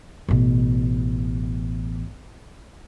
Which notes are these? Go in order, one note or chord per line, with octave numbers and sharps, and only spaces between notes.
A1 B2